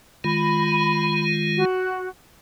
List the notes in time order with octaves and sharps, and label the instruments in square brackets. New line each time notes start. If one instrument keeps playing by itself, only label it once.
[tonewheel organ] D#3 G#3 F4 [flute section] B5
[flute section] F#4